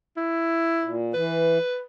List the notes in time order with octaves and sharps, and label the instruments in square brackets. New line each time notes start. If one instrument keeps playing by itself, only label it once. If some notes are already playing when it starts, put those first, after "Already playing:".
[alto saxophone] E4
[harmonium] A#2
[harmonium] E3 [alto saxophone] B4